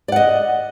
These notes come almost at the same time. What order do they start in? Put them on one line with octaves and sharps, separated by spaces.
D5 F#5 D#5